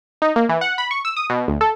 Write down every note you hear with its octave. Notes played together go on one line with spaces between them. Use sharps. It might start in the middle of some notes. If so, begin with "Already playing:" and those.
D#4
A#3
E3
F#5
B5
C#6
E6
D#6
B2
D2
A4